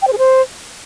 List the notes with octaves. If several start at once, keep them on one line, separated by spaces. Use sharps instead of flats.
G5
C5
G#4
C5